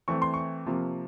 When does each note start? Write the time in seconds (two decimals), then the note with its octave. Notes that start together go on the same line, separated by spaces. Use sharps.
0.08 E3 A3 C4 C#6
0.22 C6
0.34 C#6
0.66 C3 F3 A#3